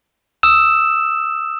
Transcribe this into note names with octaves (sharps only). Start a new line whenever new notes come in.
D#6 E6 E7